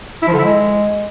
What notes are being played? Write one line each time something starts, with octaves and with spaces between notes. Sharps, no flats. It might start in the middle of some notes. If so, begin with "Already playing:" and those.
E4
F3
D3
E4
G#3